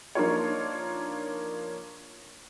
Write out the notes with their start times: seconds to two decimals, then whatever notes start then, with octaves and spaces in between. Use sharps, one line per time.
0.15 F3 A#3 D4 D#4 F4 C#5